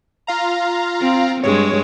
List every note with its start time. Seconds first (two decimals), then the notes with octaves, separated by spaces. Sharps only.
0.27 F4 F5 A#5
1.01 C4
1.43 G2 G#3 C#5